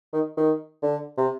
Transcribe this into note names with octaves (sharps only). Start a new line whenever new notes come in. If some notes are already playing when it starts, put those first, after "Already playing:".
D#3
D#3
D3
C3